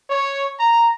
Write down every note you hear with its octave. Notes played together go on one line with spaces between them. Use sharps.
C#5
A#5